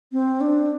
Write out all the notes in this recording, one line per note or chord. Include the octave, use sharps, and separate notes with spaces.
C4
D4